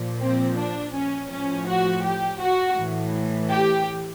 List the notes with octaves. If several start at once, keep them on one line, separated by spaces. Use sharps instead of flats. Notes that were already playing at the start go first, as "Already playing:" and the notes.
Already playing: A#2 F3
C4
D4
C#4
A2 F3 C#4
F#4
G4
F#4
A2 E3
G4